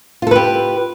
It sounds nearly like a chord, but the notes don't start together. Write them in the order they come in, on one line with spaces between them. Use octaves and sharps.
F4 A4 B4 G4